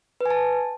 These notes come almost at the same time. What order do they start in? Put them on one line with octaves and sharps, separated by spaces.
B4 G#5 A5